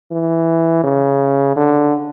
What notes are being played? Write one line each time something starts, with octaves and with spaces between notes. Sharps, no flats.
E3
C#3
D3